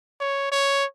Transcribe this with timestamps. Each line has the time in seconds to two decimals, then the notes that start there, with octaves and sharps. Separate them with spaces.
0.21 C#5
0.52 C#5